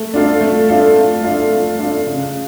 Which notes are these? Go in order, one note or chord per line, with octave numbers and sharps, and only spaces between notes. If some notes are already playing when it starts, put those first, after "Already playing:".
Already playing: A3
D4 F4 A4 F5
A3
D4 F4 A4 F5
A3
D4 F4 A4 F5
A3
D4 F4 A4 F5
C#3